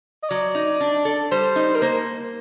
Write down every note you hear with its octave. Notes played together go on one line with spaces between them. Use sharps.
D#5
F#3 D5
D#4
D4
A4
G3 C5
D#4
A#4
A#3 C5